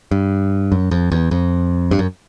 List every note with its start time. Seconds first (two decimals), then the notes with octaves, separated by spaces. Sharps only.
0.11 G2
0.72 F#2
0.91 F2
1.12 E2
1.31 F2
1.91 G2
1.99 F#2